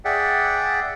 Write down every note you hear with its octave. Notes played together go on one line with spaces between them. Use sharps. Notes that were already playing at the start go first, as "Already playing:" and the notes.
G#4 D5 E5 F#5 G5